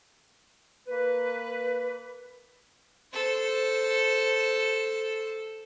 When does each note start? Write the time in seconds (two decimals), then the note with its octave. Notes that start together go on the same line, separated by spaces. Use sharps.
0.88 A#3 B4
3.14 A4 C5